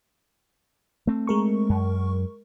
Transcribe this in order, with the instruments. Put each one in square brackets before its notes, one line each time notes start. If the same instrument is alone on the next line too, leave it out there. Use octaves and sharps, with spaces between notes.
[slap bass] A3 C4
[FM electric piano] G#3 A#4 C#6
[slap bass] F#2